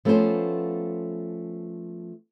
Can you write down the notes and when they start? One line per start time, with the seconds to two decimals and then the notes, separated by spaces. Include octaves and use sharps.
0.05 F3 A3 B3 C#4 B4 C5